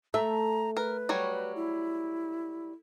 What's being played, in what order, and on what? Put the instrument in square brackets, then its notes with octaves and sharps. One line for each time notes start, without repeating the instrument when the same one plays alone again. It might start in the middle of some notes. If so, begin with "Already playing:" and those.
[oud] A3 [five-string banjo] E5 [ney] A#5
[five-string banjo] A#4 [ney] B4
[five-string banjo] F#3 G3 C#5
[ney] E4